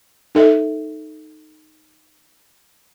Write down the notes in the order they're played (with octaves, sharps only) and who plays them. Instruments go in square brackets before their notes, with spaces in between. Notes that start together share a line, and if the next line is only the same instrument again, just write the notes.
[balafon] D#4 A4 E5